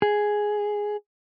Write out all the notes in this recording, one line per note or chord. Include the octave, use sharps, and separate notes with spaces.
G#4